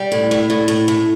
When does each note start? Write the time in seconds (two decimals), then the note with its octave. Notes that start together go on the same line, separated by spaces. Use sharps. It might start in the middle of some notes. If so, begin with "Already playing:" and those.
Already playing: G3
0.12 A2
0.31 A2
0.50 A2
0.68 A2
0.88 A2